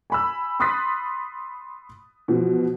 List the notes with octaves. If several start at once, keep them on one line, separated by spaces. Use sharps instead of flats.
G#5 B5 E6
B5 C6 D#6 F#6 A6 B6
B2 E3 F3